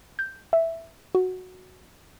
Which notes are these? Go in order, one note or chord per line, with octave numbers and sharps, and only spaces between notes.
G6
E5
F#4